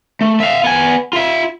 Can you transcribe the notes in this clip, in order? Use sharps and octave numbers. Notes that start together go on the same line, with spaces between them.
A3
E5 F5
B3 G#5
F4 E5